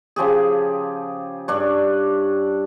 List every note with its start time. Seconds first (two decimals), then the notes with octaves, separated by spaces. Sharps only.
0.16 C#3 F3 G4 G#4
1.48 G2 D4 C#5